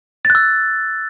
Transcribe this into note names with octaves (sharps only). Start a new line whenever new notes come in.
A6
F#6
E6